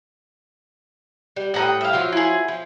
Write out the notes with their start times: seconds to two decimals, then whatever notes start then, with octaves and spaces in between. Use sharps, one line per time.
1.36 G3
1.54 A2 G3 F#5 G5 A#5 D#6
1.81 E5 F5
1.93 F3 F#3 F4
2.12 E4 G#4
2.48 F3